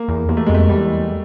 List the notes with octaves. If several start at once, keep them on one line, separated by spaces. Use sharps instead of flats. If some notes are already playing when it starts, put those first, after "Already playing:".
Already playing: A#3
E2
E2 A#3
A3
F2 G#3
A3
E2 G3